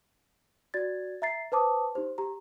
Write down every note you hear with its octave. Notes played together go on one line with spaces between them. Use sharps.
F#4 D5 G#6 A6
E5 A#5 A6 C7
B4 C5 A5 D6 D#6
D#4 G4 C5
G4 A#5